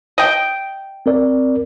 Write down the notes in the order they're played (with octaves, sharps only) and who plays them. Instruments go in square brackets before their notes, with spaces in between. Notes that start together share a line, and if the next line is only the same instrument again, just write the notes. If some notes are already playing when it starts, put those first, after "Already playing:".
[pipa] D#5 G5
[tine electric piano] C4 A#4 D5